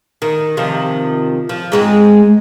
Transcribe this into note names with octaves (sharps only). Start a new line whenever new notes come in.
D#3
C3 D#3 F3
F3
G#2 G#3 C4